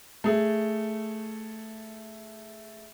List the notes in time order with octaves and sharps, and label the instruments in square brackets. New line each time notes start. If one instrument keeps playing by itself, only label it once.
[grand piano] A3 G#4